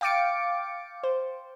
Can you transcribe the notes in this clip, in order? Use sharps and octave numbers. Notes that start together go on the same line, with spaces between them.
F5 G5 D6 A6 C#7 D7
C5